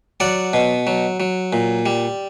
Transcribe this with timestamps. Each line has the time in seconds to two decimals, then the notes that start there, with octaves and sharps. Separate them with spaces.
0.20 F#3 D5 F#5
0.53 B2
0.87 F#3
1.20 F#3
1.53 A#2
1.86 G3